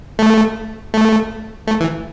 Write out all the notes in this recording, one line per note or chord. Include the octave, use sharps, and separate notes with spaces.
A3
A3
A3
E3